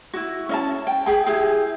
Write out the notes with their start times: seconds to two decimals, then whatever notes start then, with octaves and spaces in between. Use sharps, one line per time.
0.14 E4 F#4
0.49 C#4 D#5 A5
0.87 G5
1.06 G#4 G5
1.26 E4 G4 G#4